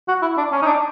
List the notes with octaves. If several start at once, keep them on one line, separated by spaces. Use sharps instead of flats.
F#4
E4
D4
C#4
D#4
D4